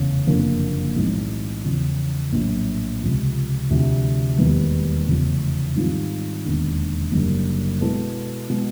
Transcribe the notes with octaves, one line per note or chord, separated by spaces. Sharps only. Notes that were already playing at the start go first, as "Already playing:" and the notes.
Already playing: F1 E2 C#3
F#1 F2 D3 F3 A#3
B1 A2 E3 G#3 C4
E2 C#3 F3
A#1 A2 F#3
C#2 C3 F3
D2 C3 F3
E1 D#2 D#3 G3 B3
F1 E2 C#3 F3 A3
G#2 D#3 G3 C4 F4
E1 D#2 D3
F#1 F#2 D3 G3
B2 G#3 B3 E4 A4
B2 G#3